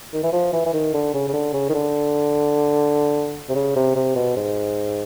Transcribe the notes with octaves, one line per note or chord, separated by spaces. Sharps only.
D#3
E3
F3
E3
E3
D#3
D3
C#3
C#3
D3
C#3
D#3
D3
C3
C#3
C3
C3
B2
G#2